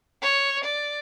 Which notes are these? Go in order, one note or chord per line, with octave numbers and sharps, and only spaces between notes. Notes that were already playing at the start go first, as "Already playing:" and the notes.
C#5
D5